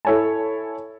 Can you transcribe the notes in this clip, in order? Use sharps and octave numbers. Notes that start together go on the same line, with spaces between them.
E4 A4 C#5 G#5 A5